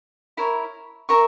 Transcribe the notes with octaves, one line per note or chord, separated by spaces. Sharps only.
E4 A#4 C#5
A#4 E5 A#5 C#6